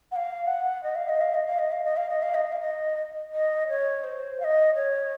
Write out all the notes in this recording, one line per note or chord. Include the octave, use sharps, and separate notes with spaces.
F#5
F5
F#5
D#5
F5
D#5
F5
D#5
F5
D#5
F5
D#5
F5
D#5
F5
D#5
F5
D#5
D#5
C#5
C5
F5
D#5
C#5